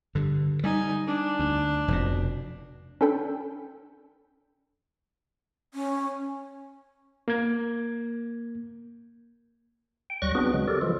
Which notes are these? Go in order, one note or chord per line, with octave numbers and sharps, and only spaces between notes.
G2 D3
G3 D#4 G#5
D4
D2
F1 F2 B2
C#4 D4 A4 G5 B5
C#4
A#3 G#6
G5
D2 F#3 G3 C#6 F#6 A#6
B3 C4 D4 F#4 G#4 B4
C#3 F#3 G#3
G4 A4 A#4 D5
E3 F3 G#3 F4 A4